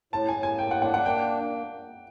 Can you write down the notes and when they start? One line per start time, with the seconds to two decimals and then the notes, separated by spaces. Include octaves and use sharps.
0.13 A2 A5
0.29 G#5
0.35 A2
0.43 G#5
0.59 A#3 G5
0.71 F#5
0.82 D4 F#5
0.94 F#5
1.06 A#3 G5